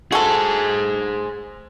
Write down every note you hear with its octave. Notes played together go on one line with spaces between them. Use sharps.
F#4 G#4 A4 C5